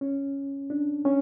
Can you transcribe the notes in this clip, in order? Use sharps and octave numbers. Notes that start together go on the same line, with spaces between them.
C#4
D4
C#4